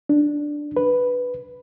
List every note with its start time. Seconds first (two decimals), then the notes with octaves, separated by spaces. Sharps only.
0.09 D4
0.77 B4